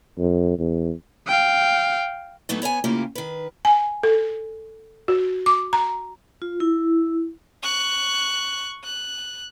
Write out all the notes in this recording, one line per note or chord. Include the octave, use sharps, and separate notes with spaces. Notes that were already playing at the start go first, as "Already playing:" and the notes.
F2
E2
F5 G5
A#2 F#3 A3 B3 D#4
B3 C#5 E5 G#5
A2 C#3 A#3 C#4 F4 G4
D#3 B4
G#5
A4
F#4
D6
A#5
F4
E4
C#6 F#6
F#6